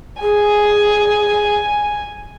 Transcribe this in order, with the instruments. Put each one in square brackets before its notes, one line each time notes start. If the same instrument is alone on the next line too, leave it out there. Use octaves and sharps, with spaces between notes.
[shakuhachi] G#4 [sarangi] G#5